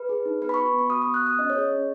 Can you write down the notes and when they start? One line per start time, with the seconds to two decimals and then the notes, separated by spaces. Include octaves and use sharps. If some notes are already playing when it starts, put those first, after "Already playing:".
Already playing: B4
0.09 G#4
0.25 D#4
0.42 B3 B4
0.49 B5
0.54 F#4 C#6
0.66 B5
0.74 B3
0.79 C#6
0.90 F#4 D#6
1.02 D#6
1.07 B3
1.14 F#6
1.23 F#4 D#6
1.39 C#4 D#5
1.50 C#5
1.55 G#4 D#5
1.72 C#4